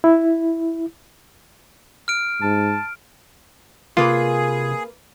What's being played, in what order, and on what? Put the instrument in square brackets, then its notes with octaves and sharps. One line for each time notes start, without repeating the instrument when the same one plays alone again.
[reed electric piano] E4
[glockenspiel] F6 D7
[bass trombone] G#2 [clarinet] A5
[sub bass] C3 [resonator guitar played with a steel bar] A#3 B4 [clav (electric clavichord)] F4 [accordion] G#4